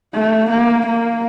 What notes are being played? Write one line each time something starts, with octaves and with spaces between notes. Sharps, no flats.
A3
A#3
A#3